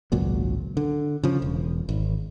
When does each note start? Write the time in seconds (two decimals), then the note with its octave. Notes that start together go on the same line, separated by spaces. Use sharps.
0.12 G#1 C#2 A#2 F#3
0.77 D3
1.23 C#3 F3
1.42 E1
1.89 G#1